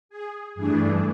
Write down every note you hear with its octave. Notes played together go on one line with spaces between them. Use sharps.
G#4
G2 E3 A3 D4 G#4